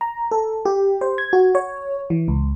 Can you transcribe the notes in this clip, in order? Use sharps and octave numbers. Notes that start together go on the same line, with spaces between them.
A#5
A4
G4
C5
G#6
F#4
C#5
E3
C#2